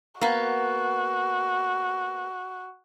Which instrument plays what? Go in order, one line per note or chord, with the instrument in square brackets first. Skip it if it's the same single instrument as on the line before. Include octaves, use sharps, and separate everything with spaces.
[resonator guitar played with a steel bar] A#3 B3 [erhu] F#4